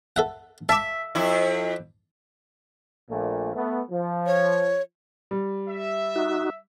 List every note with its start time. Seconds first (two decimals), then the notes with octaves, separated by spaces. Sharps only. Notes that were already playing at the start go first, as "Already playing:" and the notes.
0.16 A4 E5 F#5
0.69 E5 A5 D6
1.15 F2 E4
3.10 A#1 A#2 A3
3.53 A3 B3
3.91 F3
4.26 C#5
5.31 G3
5.69 E5
6.16 D#4 F#4